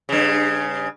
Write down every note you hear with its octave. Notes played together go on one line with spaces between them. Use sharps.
G2 C#3